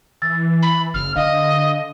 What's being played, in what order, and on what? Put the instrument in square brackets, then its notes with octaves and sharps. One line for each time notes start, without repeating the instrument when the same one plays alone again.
[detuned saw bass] E3 [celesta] E6 A6
[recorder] B5
[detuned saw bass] F#1 [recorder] F6
[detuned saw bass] D3 [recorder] D#5 [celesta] F5